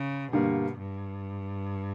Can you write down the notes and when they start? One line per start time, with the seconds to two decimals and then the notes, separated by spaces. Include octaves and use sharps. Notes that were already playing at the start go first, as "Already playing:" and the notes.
Already playing: C#3
0.32 G2 B2 D3 G3 A#3
0.78 G2